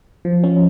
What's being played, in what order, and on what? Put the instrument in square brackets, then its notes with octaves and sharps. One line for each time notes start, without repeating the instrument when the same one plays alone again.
[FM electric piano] F3
C#4